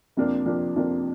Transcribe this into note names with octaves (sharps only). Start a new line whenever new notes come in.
F2 C3 F3 A#3 D4
F2 C3 F3 A#3 D4
F2 C3 F3 A#3 D4